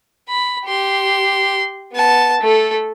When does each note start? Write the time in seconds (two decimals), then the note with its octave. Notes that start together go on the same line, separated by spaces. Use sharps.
0.29 B5
0.65 G4 C6
1.93 B3 A5
2.41 A3 A4